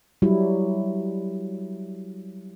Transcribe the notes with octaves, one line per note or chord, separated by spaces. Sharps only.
F#3 G3 E4